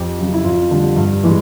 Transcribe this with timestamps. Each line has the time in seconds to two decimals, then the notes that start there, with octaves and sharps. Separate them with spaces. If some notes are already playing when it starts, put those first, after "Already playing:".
Already playing: F2 G4
0.19 C#3 F#3
0.33 E4
0.44 F2 F4
0.71 D3 G3
0.97 G2
1.23 E3 G#3